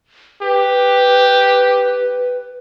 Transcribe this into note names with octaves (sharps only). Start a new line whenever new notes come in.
G4 B4